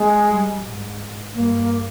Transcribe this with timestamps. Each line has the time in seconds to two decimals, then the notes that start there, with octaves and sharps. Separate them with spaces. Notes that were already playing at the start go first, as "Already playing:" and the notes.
Already playing: G#3
0.28 G3
0.63 G#2
1.34 G2 A#3